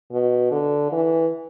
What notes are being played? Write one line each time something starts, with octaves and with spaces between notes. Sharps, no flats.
B2
D3
E3